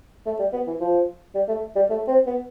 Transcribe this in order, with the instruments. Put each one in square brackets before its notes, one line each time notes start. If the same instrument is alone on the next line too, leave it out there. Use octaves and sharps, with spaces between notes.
[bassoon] A3
G3
B3
E3
F3
G3
A3
G3
A3
C4
B3